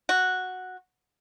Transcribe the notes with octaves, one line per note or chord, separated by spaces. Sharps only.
F#4